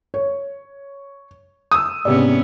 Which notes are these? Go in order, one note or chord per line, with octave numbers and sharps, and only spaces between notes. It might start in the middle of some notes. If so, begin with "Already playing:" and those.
C#5
D#6 E6
G#2 C3 B3 C#4 D5